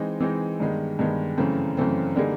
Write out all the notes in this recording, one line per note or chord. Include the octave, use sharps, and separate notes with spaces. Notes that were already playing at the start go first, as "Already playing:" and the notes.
Already playing: E3 G#3 C4 D#4
E3 G#3 C4 D#4
G2 D#3 G#3 B3
G2 D#3 G#3 B3
F#2 C#3 E3 A3 C4
F#2 C#3 E3 A3 C4
D3 G3 A#3 D#4 G#4